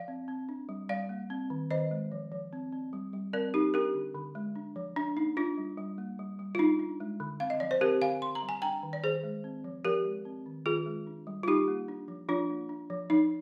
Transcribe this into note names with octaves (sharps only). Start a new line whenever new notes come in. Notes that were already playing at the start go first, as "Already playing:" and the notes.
Already playing: F3 D5 F5
C4
C4
D4
G3
G3 D5 F5
A#3
C4
D#3
D#3 C5 D#5
G#3
F3
F3
C4
C4
G3
G3
C4 A#4 D5
C4 D#4 G4
D4 G4 A#4
D3
D3
G#3
D4
F3
F3 D4
A#3 D#4
D4 F4
G3
G3
A#3
G3
G3
F4
D4 D#4
D4
G#3
D3
C4 F5
D#5
F3 D5
C5
C4 G4 A#4
D3 F5 G#5
D3 C6
A#5
G3
G#5
D4 G5 A#5
D#3
D5
D#3 G#4 C5
G#3
C4
F3
F3 G4 A#4
G#3
C4
D#3
D#3 F4 G#4
G#3
D4
G3
F4
G3 D#4 G4
A#3
D4
F3
F3 D4 F4
A#3
D4
F3
F3 D#4